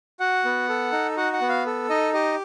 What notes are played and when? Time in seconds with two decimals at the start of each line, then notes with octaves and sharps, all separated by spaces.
0.20 F#4 F#5
0.45 B3
0.69 A4
0.92 D#4
1.17 F#4 F#5
1.33 F#5
1.41 B3
1.49 F5
1.66 A4
1.90 D#4 D#5
2.14 G4 D#5